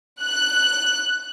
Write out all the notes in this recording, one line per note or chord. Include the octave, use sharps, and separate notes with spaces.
F#6